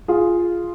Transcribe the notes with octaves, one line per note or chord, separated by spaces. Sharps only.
F4 G#4